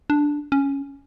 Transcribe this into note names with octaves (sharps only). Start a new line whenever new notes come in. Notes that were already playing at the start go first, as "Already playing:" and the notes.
D4
C#4